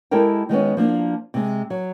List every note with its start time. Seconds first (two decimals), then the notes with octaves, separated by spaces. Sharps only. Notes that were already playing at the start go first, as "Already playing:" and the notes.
0.11 G#3 E4 G4 A4 A#4 G5
0.49 D#3 G#3 B3 C#4
0.77 F3 A#3 D4
1.34 C3 G#3
1.70 F#3